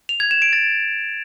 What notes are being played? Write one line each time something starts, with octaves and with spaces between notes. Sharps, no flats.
F7
G#6
E7
D7
A6